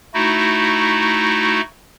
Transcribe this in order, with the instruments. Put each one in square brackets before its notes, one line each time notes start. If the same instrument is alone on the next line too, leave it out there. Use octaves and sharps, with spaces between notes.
[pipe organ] A3 D#4 E4 F#4